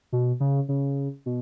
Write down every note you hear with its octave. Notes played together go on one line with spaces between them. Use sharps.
B2
C#3
C#3
B2